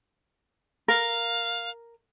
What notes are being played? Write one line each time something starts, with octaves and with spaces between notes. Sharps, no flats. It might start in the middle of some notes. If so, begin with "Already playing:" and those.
A#4 F5